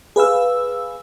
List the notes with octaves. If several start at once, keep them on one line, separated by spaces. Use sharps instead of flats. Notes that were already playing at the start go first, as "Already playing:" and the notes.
G#4 B4 F5 E6